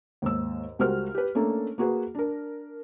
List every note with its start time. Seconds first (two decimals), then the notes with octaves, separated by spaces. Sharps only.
0.22 D#2 G#2 E6
0.79 C#2 G3 F#4 A#4 C5 F6
1.15 G4 B4
1.35 A3 A#3 C#4 D4 A4
1.78 A#3 F#4 G#4 B4
2.15 D4 A#4